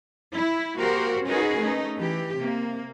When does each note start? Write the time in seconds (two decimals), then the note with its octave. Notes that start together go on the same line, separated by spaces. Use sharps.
0.34 E4
0.78 A#3 F#4 G4 A#4 C5
1.26 C#4 D#4 F#4 G#4 A#4 B4
1.59 A3 C#4 D#4
1.97 E3 G4
2.40 C3 A#3